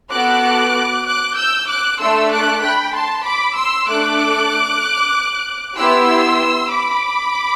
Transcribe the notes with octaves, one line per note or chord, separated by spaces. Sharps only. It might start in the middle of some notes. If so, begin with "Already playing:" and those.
B3 F#4 A4 D6 F#6
D6 F#6
E6 G6
D6 F#6
A3 D4 A4 C6 E6
D6 F#6
G5 B5
A5 C6
B5 D6
C6 E6
A3 D4 A4 D6 F#6
B3 E4 G4 C6 E6
B5 D6